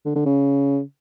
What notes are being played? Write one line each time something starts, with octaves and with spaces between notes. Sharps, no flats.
D3
D3
C#3